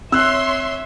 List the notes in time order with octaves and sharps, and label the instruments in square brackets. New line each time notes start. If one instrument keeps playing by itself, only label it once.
[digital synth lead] C4 [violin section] C#5 C6 [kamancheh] E5 [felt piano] E6 F#6